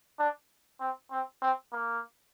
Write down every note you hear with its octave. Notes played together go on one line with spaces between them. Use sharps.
D4
C4
C4
C4
A#3